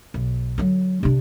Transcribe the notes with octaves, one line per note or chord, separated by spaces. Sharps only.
B1
D3 F#3
C3 D4